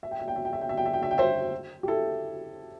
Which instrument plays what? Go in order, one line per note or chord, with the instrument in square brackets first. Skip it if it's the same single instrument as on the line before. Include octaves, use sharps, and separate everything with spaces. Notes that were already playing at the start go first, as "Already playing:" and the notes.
[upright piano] E5
G5
E5
G5
E5
G5
E5
G5
E5
G5
E5
G5
E5
G5
C5 E5
G4
E4 A4